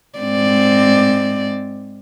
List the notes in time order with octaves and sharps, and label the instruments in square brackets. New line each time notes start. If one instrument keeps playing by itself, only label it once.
[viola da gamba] G#2 C4 D5